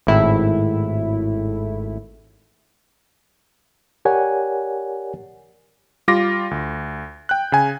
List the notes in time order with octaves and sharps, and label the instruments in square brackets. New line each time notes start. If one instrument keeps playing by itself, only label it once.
[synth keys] G#1 A2 E4
[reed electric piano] G4 A#4 C#5 D5 F#5 G#5
[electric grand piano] G3 F4 D6 A#6
D2
G5 F#6
C#3 G#5